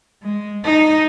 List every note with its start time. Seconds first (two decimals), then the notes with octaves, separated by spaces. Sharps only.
0.23 G#3
0.64 D#4